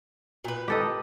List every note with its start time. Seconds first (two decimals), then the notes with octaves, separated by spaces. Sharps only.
0.44 A#2 B4
0.68 G4 A4 D#5